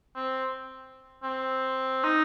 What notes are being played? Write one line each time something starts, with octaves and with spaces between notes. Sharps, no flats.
C4
C4
D#4